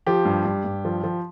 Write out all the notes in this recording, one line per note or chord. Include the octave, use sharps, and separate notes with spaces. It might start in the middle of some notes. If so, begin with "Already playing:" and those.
F3 G4
G2
G2
G2
F3
F3